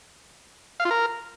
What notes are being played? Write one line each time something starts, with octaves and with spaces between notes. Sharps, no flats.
F5
F4
A#4